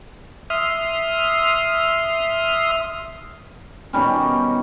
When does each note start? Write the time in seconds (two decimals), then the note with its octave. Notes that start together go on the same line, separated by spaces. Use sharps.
0.50 E5 C6 D#6 F6
3.93 B2 D#3 G3 C#4